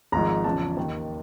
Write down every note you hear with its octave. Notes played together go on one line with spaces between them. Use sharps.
G#1 G#2 F3 A#5
E2 C#3 F3 A5
D#2 D#3